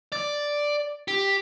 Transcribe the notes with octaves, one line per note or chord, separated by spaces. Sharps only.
D5
G4